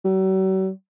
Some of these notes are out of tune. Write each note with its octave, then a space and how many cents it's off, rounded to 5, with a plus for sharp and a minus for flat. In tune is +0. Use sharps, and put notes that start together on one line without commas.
F#3 +45